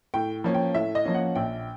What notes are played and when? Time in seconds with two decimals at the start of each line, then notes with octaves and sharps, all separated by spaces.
0.14 A2 G5
0.44 F3 A#3 C#4
0.54 G5
0.74 A2 E5
0.95 D#5
1.05 F3 A#3 C#4
1.14 F#5
1.35 A#1 G5